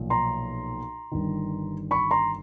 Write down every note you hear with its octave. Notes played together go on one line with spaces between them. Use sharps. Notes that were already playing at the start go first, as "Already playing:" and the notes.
Already playing: B1 A#2 F3
A#5 C6
G1 G2 D#3
B5 C#6
A#5 C6